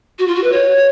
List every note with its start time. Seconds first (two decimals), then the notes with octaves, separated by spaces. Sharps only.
0.19 F#4
0.28 F4
0.35 F#4
0.44 B4
0.52 C#5